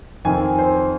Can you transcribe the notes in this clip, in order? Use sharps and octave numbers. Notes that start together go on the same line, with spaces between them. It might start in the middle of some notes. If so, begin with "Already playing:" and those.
F2 D#3 C4 G#5
C5